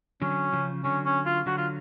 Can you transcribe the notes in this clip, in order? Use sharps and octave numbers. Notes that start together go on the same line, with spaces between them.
D3 F#3 C#4
C#3 F3
D3 F#3 C#4
C#4
F4
D3 F#3 F#4
F4